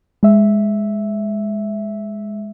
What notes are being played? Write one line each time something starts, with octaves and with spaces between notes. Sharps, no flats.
G#3 E5